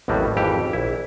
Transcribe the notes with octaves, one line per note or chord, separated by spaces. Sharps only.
A1 D#2 A2 F#3 G3
G#1 F2 E3 G4
A#1 E4